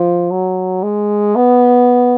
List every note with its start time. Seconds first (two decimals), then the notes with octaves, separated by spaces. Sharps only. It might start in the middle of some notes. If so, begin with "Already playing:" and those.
Already playing: F3
0.31 F#3
0.83 G#3
1.35 B3